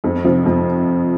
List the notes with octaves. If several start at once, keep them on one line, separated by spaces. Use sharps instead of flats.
F2
C3 F3
F2